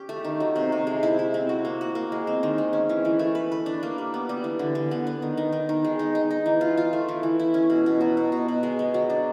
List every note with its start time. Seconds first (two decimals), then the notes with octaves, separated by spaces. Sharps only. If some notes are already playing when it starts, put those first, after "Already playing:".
Already playing: C#4 G4
0.09 A3
0.25 D#3
0.40 F#3
0.56 C3
0.72 C3
0.87 G#3
1.03 E4
1.19 E4
1.34 C4
1.49 F#4
1.65 A#3
1.81 F#4
1.95 A#3
2.12 G#3
2.27 C4
2.43 D#3
2.58 G#3
2.73 C#4
2.89 E3
3.05 E3
3.19 A3
3.35 B4
3.52 B4
3.66 D4
3.83 A#3
3.98 G3
4.14 B3
4.29 G3
4.44 E3
4.59 D3
4.75 D3
4.91 B3
5.07 B3
5.22 D#3
5.37 D#3
5.52 D#3
5.69 D#3
5.85 G#3
5.99 D#4
6.15 D#4
6.31 D#4
6.46 E3
6.61 F4
6.77 F4
6.93 A3
7.09 E3
7.23 E3
7.40 E4
7.54 C#4
7.70 B2
7.86 B2
8.01 F#3
8.17 B2
8.32 B2
8.48 B2
8.63 G#3
8.79 G#3
8.94 F#3
9.10 D4